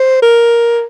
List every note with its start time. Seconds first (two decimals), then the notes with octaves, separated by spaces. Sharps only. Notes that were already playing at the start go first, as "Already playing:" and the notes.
Already playing: C5
0.22 A#4